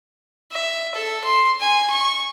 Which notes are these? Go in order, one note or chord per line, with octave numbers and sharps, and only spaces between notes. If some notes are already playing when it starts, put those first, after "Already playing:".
E5
A4
C6
G#5
C#6